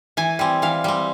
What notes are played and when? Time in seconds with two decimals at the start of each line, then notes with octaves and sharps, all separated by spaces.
0.17 E3 G#5
0.39 G3 C4
0.62 E3 F5
0.84 G3 C4